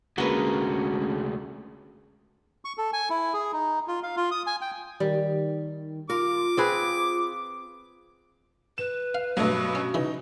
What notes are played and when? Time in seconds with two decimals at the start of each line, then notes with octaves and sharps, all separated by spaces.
0.18 D2 D3 G#3 A#3 C#4 F#4 B4
2.65 C#6
2.78 A4
2.93 G#5
3.10 E4
3.33 G#4
3.53 D#4
3.88 F4
4.03 F5
4.17 F4
4.31 D#6
4.47 G#5
4.61 G5
5.00 D#3 G3
6.10 F4 A#4 D6
6.57 C4 G#4 B4
8.78 B4 E7
9.15 F5
9.37 G2 B2 F#3 A3 A#3
9.75 C#4 F#4
9.94 C#3 E3 D#4